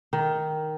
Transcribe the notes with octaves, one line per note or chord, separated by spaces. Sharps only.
D#3